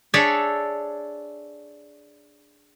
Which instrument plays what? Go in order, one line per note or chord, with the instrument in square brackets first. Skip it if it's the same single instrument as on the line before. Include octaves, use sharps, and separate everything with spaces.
[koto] D4 G#4 A4 C#5 D5 E5